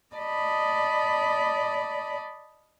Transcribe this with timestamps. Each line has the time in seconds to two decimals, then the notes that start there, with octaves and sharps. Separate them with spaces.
0.15 D5 D#5 A5 B5